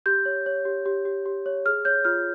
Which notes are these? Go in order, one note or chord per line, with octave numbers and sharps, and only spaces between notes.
G4 G6
C#5
C#5
G4
G4
G4
G4
C#5
G#4 F6
C#5 G6
F4 F6